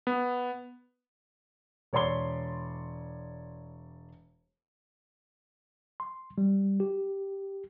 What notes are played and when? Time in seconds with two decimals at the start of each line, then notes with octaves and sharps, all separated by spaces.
0.07 B3
1.93 E1 C#5 D5 B5 C6 G7
6.00 C6
6.38 G3
6.80 G4